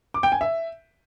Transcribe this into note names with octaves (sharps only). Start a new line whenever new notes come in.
D6
G5
G#5
E5